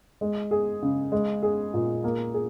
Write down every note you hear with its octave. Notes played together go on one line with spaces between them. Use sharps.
G#3
G#4
C#3
G#3
G#4
A#2
A#3
G#4